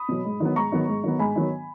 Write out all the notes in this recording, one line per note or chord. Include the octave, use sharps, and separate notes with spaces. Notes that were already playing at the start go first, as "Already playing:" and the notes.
Already playing: B5 D#6
B2 F#3
G#2
D#3 F#3 B3
G#2 A#5 C#6
D#3 F#3 B3
G#2
D#3 F#3 B3
G#2 G#5 B5
D#3 F#3 B3